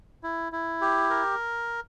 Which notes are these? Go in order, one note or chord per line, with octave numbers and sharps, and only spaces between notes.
E4
E4
G4
A#4